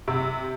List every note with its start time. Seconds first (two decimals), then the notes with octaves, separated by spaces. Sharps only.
0.08 C3